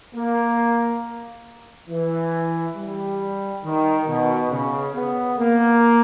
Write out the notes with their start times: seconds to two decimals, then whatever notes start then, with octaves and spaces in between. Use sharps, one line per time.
0.14 A#3
1.89 E3
2.76 G3
3.64 D#3
4.08 B2
4.51 C#3
4.95 B3
5.38 A#3